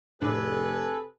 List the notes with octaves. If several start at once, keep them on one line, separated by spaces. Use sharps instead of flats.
F1 A2 C3 D4 G#4 A4 B4